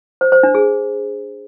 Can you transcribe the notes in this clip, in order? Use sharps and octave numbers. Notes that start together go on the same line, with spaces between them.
C5
C5
D4
G#4